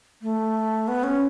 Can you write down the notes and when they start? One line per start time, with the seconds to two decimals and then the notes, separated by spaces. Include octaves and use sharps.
0.22 A3
0.88 B3
1.04 C#4